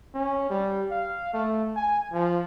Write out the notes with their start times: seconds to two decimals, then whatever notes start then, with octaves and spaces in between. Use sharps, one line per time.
0.14 C#4
0.50 G3
0.91 F5
1.34 A3
1.76 G#5
2.13 F3